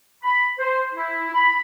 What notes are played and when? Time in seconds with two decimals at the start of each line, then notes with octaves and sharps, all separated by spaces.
0.23 B5
0.59 C5
0.94 E4
1.34 B5